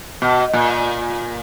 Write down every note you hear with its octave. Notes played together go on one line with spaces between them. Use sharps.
B2
A#2